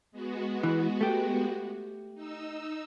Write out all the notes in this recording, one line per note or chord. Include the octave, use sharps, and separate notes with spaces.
G#3 B3 F#4
E3
A3 G4
D#4 E6